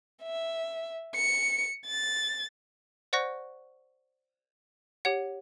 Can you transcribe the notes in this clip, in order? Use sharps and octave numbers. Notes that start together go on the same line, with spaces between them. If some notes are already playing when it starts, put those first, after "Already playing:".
E5
C#7
A6
C5 D5 F#5 C#6 F#6 A#6
G4 C#5 F#5